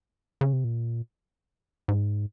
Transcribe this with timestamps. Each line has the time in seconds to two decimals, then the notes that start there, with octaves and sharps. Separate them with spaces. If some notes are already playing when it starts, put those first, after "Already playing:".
0.41 C#3
0.53 C3
0.64 A#2
1.88 G#2